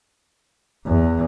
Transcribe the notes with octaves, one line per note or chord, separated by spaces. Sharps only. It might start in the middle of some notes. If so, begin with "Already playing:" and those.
E2